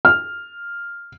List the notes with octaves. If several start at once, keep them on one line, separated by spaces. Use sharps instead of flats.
F6